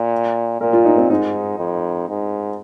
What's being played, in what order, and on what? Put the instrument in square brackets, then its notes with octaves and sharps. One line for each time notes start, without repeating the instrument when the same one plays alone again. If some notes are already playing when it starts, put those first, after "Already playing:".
Already playing: [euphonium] A#2
[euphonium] A#2 [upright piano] A#4
[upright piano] F4
D#4
C4
[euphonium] G#2 [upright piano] D#4
[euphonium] F2
G#2